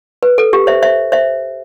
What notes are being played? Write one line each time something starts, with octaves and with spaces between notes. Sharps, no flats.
B4
A4
G4
C5 E5
C5 E5
C5 E5